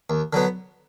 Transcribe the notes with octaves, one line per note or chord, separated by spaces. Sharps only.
D#2
D3 F#3 B3